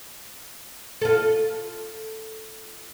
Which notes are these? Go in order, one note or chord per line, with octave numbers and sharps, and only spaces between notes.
F4 A4